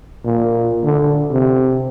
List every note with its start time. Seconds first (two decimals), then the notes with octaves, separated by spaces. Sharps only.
0.25 A#2
0.84 D3
1.31 C3